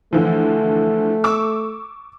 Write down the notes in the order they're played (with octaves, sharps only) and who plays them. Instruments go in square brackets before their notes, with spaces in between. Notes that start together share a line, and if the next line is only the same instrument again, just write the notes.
[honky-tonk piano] D3 E3 F3 [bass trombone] A3
[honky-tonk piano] C#6 D6 E6